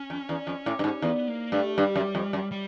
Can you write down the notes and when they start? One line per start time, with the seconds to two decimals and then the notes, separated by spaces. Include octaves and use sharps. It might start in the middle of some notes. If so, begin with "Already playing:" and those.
Already playing: C#4
0.10 F2
0.29 E2
0.47 F2
0.66 A2
0.79 G2
0.84 G#2
1.02 E2 B3
1.28 A#3
1.52 G2 A3
1.77 G2 G3
1.96 F#2
2.15 F2
2.33 F#2
2.52 G3